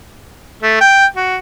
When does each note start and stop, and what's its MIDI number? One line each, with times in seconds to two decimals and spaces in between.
0.62 0.77 57
0.81 1.05 79
1.16 1.37 66